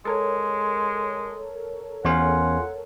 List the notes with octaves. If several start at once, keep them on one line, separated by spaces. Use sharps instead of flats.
G#3 A4 A#4 C#5
E2 C#4 F4 G#4 C5 F#5